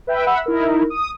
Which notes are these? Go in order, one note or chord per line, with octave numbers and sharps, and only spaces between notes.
B4 E5 G5
E5 F#5 B5 E6
D#4 E4 A#4
D#6